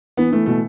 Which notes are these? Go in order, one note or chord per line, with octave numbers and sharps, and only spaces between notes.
E3 B3
E3 A3
B2 A3